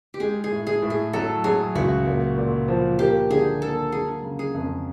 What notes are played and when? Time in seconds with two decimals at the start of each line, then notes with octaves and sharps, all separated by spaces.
0.14 G4
0.20 G#3 G#4
0.44 G#4
0.51 A2
0.67 G#4
0.82 A2
0.90 G#4
1.13 F#3 A4
1.44 F#3 G#4
1.75 C#2 F#4
2.07 A#2
2.38 A#2
2.68 F3
2.99 A#3 G4
3.30 D3 G#4
3.61 A#3 A4
3.92 F#3 G#4
4.23 C#3
4.39 G#4
4.54 F2